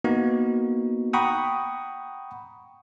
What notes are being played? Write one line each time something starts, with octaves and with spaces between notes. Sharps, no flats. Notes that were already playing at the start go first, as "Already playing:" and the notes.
A#3 B3 D#4 F#4
F#5 G5 A#5 B5 C#6 D#6